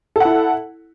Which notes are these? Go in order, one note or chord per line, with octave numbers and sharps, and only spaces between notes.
E4 A4 F#5